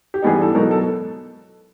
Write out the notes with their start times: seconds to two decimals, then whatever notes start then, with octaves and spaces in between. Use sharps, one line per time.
0.14 G4
0.22 G2 E3 G3 B3 D#4 G#4
0.42 A4
0.55 B2 F#3 B3 D#4 A#4
0.71 A4